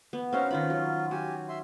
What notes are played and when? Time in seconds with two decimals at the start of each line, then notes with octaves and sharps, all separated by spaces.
0.13 B3
0.33 C4 C#4 D#4 F#4 F5
0.51 D#3 C#4 F4 B5
0.70 F#3
1.11 F#4 G4 G#5
1.49 E5 C6